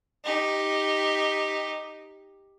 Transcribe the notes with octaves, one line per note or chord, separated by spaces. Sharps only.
D#4 G4